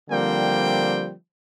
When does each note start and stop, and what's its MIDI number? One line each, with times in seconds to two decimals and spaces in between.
0.10 1.13 50
0.10 1.13 53
0.10 1.13 55
0.10 1.13 58
0.10 1.13 60
0.10 1.13 79